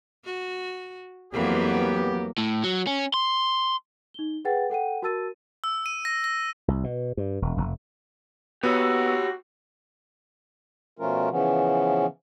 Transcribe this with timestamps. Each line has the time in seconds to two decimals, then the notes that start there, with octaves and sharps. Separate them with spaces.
0.24 F#4
1.33 F2 E3 F#3 A#3 B3 G4
2.38 A2
2.64 F#3
2.87 C#4
3.14 C6
4.14 D#4 G7
4.45 G#4 B4 F#5 G5 A6
4.70 A4 F#5 G5 D#7
5.02 F#4 A#4 A5 E6 A6 D#7
5.64 E6
5.86 D#7
6.05 A#6
6.24 A#6
6.68 C2
6.84 B2
7.17 G2
7.42 E1
7.57 F1
8.63 B3 F#4 G4 C#5 E6
10.99 B2 F3 A3 C#4 F4 A#4
11.31 C#3 E3 F3 B3 C#4